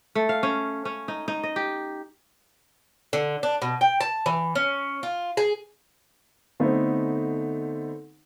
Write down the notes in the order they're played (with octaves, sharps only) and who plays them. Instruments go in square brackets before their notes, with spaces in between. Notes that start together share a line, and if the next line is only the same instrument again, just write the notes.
[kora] A3
F5
C#4
C#4
D#4
D#4
D#5
G4
[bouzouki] D3
D4
B2
G5
A5
E3
C#4
F4
G#4
[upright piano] D3 A3 B3 C4 D#4